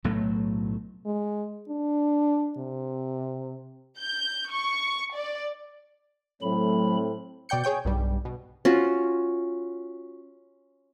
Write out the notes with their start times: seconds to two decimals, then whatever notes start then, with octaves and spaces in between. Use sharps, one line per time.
0.04 B1 A2 F#3 A3
1.06 G#3
1.69 D4
2.58 C3
4.00 G6
4.52 C#6
5.15 D5
6.42 A2 F#3 A3 C4 B5
7.49 B2 D5 G5 G6 C#7
7.64 G#4 C#5 G5 G6
7.85 B1 G2 G3
8.25 B2
8.65 C#4 F4 F#4